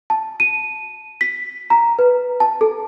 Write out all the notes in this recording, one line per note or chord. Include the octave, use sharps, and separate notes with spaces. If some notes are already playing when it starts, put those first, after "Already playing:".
A5
D#7
B6
A#5
B4
A5
A4